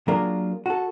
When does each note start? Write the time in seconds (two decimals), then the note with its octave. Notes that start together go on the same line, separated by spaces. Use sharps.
0.08 F#3 A#3 D4 F4 G#4 A#4
0.66 F#4 A4